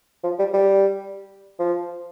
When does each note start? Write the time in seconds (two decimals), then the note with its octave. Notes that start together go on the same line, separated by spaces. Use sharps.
0.24 F3
0.39 G3
0.54 G3
1.59 F3